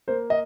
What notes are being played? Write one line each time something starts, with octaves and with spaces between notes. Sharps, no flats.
A#3 C5
D#5